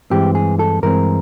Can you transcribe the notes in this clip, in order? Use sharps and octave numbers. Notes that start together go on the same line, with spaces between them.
G2 E3 G#3 C4 G4
G#4
A4
G2 E3 G#3 C4 A#4